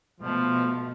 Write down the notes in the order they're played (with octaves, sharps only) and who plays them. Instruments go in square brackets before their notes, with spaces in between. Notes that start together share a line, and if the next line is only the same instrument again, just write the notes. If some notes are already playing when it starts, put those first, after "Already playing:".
[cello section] B2 A3 [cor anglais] F3